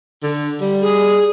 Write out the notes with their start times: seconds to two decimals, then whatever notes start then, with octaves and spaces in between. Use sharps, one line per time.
0.23 D3
0.61 G3
0.82 G#4